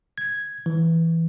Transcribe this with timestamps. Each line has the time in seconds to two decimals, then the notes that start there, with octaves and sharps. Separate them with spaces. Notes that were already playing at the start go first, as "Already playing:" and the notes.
0.18 G#6
0.66 E3